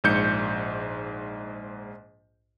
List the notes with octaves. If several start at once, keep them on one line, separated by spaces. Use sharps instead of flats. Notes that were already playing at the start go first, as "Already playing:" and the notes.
A#1 G#2 G6 C#7